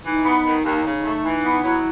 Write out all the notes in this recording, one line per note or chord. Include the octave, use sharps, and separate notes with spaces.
E3 D#4
B3
D#3
D#2
C#3
A3
E3
B3
F#3 E4